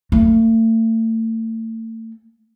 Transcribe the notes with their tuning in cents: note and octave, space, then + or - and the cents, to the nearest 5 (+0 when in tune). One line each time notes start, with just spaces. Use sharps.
A3 +40